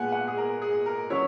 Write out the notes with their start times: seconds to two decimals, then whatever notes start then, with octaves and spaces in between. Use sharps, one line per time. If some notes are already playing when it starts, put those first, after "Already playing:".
Already playing: A#2 G#3 B3 F#5 G#5
0.12 F#5
0.28 G#4
0.37 A#4
0.62 G#4
0.86 A#4
1.10 F#3 C#4 E4 C#5